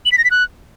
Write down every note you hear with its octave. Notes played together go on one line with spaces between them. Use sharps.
F#7
B6
A#6
B6
F#6